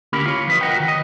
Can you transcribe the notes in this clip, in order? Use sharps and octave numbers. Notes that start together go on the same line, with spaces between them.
D2 A#3 C#4 G4 A#4 B5
F4 C#5
F3 B4 D#5
A#4 B4 D#5 F#5 G5
D#3 F#4
D#5